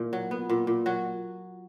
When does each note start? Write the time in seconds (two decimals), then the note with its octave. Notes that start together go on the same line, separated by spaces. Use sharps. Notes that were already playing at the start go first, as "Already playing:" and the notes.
Already playing: A#2 E4
0.13 F#3
0.31 B3
0.50 A#2
0.67 A#2
0.86 F#3 F#4